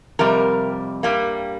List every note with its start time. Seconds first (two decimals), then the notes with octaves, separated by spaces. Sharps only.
0.19 F2 C3 G3 A#4
1.03 G2 G3 A#3